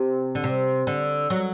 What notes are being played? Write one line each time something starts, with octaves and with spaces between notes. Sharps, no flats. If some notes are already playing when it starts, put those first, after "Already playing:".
Already playing: C3
D3
C3
D3
F#3